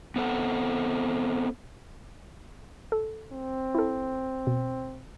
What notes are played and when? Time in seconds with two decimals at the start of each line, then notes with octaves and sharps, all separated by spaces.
0.16 B3 C4 A4 F#5
2.92 A4
3.32 C4
3.75 E4 A4
4.47 B2